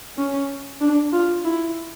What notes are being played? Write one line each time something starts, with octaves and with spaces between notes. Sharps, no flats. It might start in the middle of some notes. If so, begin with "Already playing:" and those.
C#4
D4
F4
E4